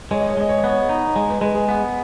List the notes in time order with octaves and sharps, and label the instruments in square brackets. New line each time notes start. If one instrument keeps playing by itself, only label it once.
[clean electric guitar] G#3 [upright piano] C#5
[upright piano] D#5
C#5
[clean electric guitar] G#3 [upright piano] D#5
[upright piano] C#5
D#5
[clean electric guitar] B3 [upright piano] C#5
[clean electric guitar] D#4
G#3
[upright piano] B4
[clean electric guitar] G#3 [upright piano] B4
[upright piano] G#4
[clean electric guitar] B3